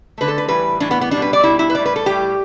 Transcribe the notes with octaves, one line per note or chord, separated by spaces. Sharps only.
D3 A3 B4
A4
B4
A2 E3 G3 B4
A2 E3 G3 D4
B3
B3
B2 G3 D4
B4
D5
B2 G3 E4
E4
B4
A2 G3 D5
B4
A4
A2 G3 G4